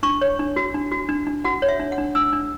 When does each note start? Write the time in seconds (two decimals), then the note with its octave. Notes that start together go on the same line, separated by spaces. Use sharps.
0.03 D4 C#6
0.21 C#5
0.39 D4
0.56 F#4
0.75 D4
0.92 F#4
1.09 D4
1.27 D4
1.44 F#4 F#5
1.62 C#5
1.68 E5
1.80 D4
1.92 F#5
1.98 D4
2.15 D4 E6
2.33 D4